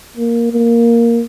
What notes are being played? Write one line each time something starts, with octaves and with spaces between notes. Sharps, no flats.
A#3
A#3